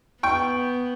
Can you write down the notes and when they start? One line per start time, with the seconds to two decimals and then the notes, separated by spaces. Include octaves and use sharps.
0.23 B3 G5 C#6